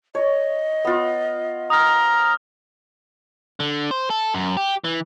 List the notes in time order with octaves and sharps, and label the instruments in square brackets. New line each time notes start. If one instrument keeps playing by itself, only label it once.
[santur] C#5 [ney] D#5
[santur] B3 F4
[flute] A#5 [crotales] D#6 F6
[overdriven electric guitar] D3
C5
A4
F#2
G4
E3